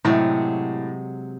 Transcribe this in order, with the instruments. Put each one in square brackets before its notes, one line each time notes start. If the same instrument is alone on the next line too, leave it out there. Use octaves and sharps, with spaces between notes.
[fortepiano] A2 [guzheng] C3 F#3 G#3